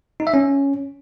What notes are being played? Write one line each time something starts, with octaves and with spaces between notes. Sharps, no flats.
D#4
E5
C#4